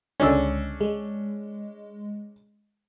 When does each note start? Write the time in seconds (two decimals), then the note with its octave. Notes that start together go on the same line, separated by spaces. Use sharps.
0.20 C#2 D3 G#3 C#4 D4 E6
0.81 G#3